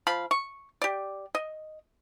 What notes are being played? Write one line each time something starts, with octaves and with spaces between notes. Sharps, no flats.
F3 F5 B5
C#6
G4 D5
D#5